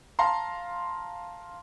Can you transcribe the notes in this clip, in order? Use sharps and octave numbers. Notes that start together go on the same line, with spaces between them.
F5 A5 A#5 C6